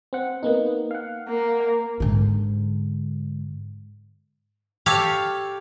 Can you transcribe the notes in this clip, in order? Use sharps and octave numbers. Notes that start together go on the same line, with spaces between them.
C4 F#5
A#3 B3 D#4
F5 F#5
A#3
G#2 D3
G4 A4 C#5 F5